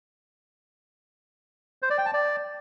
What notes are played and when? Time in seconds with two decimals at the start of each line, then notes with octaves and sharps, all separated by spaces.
1.82 C5
1.90 D5
1.98 G5
2.06 A5
2.13 D5